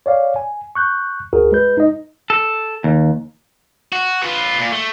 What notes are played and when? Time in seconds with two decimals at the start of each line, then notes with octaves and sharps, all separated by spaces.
0.06 C#5 D5 F5
0.36 G#5
0.75 C#6 F#6 G6
1.33 D2 F#4 G#4 A#4
1.52 G#3 B4 G6
1.77 D#4 D#5
2.30 A4
2.84 D#2
3.92 F#4
4.23 F4 B4
4.59 A#2
4.72 A3